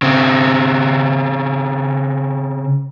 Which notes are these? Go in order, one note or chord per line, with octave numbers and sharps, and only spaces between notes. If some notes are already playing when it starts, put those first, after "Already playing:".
C#3 C4